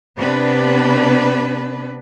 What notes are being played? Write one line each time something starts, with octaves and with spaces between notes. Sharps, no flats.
C3 B3 D4 B4